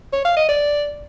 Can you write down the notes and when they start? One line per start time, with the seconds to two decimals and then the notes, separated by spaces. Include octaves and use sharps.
0.13 C#5
0.25 F5
0.37 D#5
0.49 D5